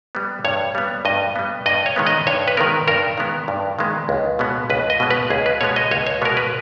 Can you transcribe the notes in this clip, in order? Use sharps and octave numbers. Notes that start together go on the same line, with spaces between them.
G3 B3
G2 C#5
G3 B3
G2 D#5
G3 B3
G2 D#5
C#5
D#3 G#3 B3
D#5
G2 C#5
B4
D#3 G#3 B3 A#4
G2 A#4
D#3 G#3 B3
G2
D#3 G#3 B3
C#2
B2 G#3 B3
C#2 B4
D#5
B2 G#3 B3
B4
C#2 G#4
B4
B2 G#3 B3 C#5
D#5
C#2 C#5
C#5
B2 G#3 B3 A#4
B4